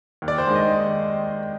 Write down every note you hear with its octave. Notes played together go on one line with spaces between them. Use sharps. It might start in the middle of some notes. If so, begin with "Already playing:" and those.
D#2
D5
C5
D#3 G#3
D#5